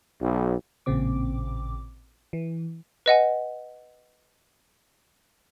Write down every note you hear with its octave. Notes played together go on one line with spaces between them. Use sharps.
B1
A1 A#2 C#3 C4 D6
E3
B4 D#5 F#5 G#5